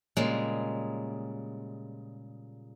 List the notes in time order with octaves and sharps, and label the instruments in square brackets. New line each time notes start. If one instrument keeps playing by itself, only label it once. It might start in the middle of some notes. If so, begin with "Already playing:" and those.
[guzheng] A#2 C#3 G3 G#3 A#3